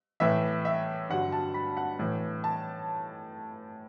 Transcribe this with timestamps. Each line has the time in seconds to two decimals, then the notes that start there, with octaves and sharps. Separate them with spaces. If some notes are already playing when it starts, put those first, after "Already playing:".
0.20 A2 E3 E5
0.65 E5
1.09 G2 D3 F#3 F#5
1.32 A5
1.54 B5
1.77 F#5
1.99 A2 E3
2.44 A5